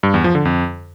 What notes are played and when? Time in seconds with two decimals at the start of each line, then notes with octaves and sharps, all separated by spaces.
0.03 G2
0.14 E2
0.24 F3
0.35 D3
0.45 F2